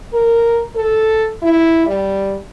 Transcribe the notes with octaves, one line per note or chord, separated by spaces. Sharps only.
A#4
A4
E4
G3